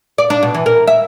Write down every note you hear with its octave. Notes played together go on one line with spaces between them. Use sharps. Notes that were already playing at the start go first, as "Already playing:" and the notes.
D5
D4
B2
E3
A#4
E5